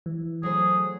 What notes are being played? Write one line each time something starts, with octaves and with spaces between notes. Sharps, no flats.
E3
F#3 A3 G#4 C5